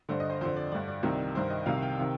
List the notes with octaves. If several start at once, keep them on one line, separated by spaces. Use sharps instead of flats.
G2 D3 C5
D#5
C5
F2 D3 C5
D5
G2 D3 D5
D5
C2 C3 D#3
G2 D#3 C5
D#5
C2 C3 D#3 F5
G5
C3 D#3